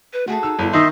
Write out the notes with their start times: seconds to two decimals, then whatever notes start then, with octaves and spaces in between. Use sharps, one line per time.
0.13 B4
0.27 A3 F#4 G#4 A4
0.43 D#4 E6
0.59 G1 E4
0.73 D#3 D#4 D#5 E5 C6